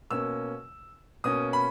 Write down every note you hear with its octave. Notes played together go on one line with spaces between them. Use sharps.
B2 A#3 C#4 E6
B2 A#3 C#4 D#6
B5